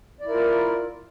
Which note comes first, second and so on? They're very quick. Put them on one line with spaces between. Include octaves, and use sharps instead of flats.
D5 E4 A#4 F4